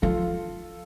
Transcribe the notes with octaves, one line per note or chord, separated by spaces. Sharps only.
F3 F4 A4